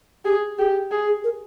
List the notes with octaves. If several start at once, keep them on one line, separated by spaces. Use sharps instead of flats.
G4 G#4
G4 G#4
G#4
G#4
A#4